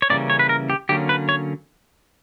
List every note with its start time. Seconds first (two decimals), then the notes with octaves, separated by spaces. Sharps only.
0.02 C#5
0.10 C#3 E3 G3 A#3 C#4 D5
0.30 C#5
0.39 B4
0.49 A#4
0.70 G4
0.89 D3 F#3 A#3 C#4 G4
1.09 B4
1.29 C#5